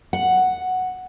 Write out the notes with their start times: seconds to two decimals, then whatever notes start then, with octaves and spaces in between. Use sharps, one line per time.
0.13 F#5